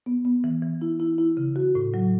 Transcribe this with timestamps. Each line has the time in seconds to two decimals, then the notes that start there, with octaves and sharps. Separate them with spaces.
0.06 B3
0.25 B3
0.44 E3
0.62 E3
0.82 E4
1.00 E4
1.18 E4
1.37 C#3
1.56 F#4
1.75 A2
1.94 F#3